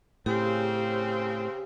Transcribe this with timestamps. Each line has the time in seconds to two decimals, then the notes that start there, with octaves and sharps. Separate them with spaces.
0.26 A2 C#3 C4 G4